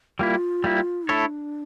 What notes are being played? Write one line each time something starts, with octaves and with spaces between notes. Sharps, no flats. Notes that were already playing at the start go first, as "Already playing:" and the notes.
G3 A#3 E4 F4
G3 A#3 E4
A3 D4 E4 A4 C#5